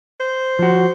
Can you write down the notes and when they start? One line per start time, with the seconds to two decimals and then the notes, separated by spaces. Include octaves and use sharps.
0.20 C5
0.59 F3 F#4